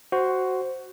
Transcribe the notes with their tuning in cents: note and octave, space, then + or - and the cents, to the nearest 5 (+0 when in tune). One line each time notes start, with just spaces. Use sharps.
F#4 +10 C5 +0